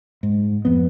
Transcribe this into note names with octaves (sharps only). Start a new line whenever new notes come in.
G#2
F2 B3